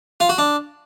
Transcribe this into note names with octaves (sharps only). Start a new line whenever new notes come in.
F4
F#4
D4